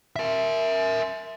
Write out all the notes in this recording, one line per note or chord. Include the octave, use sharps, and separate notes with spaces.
A#4 E5